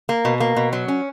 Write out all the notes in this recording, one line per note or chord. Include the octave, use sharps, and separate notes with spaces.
A#3
B2
A#3
B2
F#3
C#4